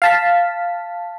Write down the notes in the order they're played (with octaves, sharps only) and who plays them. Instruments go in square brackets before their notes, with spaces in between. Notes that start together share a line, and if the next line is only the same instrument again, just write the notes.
[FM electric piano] F5 A5 B6